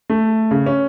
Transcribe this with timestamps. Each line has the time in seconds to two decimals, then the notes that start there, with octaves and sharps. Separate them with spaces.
0.10 A3
0.51 C#3
0.66 C#4